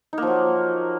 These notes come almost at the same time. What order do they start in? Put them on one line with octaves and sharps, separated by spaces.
D#4 A#3 F3 F#3